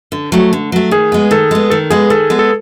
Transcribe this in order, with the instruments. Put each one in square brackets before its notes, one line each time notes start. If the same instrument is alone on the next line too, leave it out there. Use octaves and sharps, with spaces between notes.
[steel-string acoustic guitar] D3
F#3 A3
D3
F#3 A3
[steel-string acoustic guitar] D#3 [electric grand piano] G#4
[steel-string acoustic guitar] G#3 B3
[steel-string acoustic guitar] D#3 [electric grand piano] A4
[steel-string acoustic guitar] G#3 B3
[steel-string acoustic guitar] D#3 [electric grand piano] A4
[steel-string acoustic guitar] G#3 B3 [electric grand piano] G#4
[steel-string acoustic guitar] D#3 [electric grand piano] A4
[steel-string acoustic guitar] G#3 B3
[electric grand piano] A4